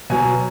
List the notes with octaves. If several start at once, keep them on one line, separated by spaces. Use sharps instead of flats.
B2 F#3 G#5